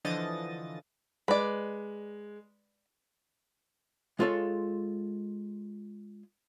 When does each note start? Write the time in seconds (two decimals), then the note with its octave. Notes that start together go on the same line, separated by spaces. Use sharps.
0.04 D3 E3 F3 D#5 D#6 A6
1.28 G#3 B4 D5
4.19 G#3 F4 G#4 A4 C#5 F5